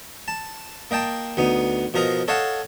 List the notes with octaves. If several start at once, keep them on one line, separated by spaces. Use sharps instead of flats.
A5
A#3 D#5 G5 A5
D2 B3 D#4
B2 F3 A#4 D#5 A#5
A4 C#5 D#5 F5 F#5 A5